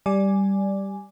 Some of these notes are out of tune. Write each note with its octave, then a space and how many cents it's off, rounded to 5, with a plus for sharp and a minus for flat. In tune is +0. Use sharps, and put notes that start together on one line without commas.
G3 +0 D5 +0 G#5 +0